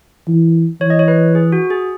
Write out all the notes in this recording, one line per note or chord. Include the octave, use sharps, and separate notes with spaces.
E3
E3 C#5
D#5
C#5
B4
G#4
F#4
G#4